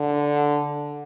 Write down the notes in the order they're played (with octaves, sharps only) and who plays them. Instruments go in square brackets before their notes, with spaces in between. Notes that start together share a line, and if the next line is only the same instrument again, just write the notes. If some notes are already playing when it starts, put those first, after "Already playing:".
Already playing: [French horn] D3